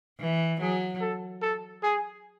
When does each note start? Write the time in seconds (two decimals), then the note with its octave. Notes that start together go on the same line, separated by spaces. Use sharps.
0.20 E3
0.61 F#3 G#4
1.01 A4
1.42 A4
1.83 G#4